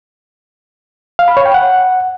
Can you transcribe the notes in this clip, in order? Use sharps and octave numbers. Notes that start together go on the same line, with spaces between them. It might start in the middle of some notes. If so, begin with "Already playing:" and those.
F5
B5
C#5
G5
F#5